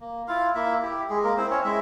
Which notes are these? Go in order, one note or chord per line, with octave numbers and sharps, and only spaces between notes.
A#3
E4 F4 F5
A#3 E4 E5
E4 G4
G#3 G#4
A#3 A#4
C4 E4 C5
C#4 C#5
G#3 E4 E5